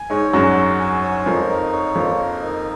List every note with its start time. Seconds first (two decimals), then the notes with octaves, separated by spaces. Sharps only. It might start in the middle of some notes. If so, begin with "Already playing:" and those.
Already playing: G#5
0.10 G#2 G#3 C#5
0.33 F#2 F#3 F#4
0.56 F#4
0.80 G#5
1.03 C#5
1.26 F2 F3 A#4
1.49 D#4
1.72 C#5
1.95 F2 F3 A#3
2.18 A#4
2.42 D#4